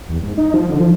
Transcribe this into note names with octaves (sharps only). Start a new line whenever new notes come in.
E2
G#2
D#4
F3
D3
F3